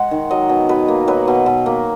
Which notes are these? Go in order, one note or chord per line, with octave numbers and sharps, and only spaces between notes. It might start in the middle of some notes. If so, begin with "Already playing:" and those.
Already playing: G#3 F#5
D#3
F#3 D#5
B2
B2 B4
A#3
F#3 B4
B2
B2
A#3